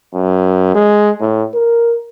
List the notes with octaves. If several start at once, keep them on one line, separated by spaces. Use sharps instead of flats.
F#2
G#3
A2
A#4